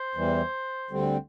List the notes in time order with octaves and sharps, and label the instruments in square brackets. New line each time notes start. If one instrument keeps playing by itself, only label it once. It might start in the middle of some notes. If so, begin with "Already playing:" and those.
Already playing: [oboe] C5
[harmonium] E2 E3 G3
D2 D3 G3 C4